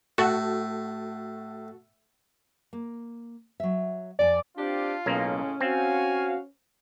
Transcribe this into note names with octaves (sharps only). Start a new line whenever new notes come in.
A2 F#4 A4
A#3
F#3 E5
F2 D5 G#5
C4 D4 F4 G4 D5
B1 A2 C#3 G#3 A#3 C#4
C4 F#4 F5 G#5